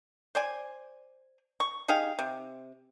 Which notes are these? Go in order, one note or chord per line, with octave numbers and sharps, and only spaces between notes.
C5 D5 G#5
C#6
D#4 G4 G#4 F5
C3